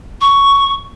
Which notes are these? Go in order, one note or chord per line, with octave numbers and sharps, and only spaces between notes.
C#6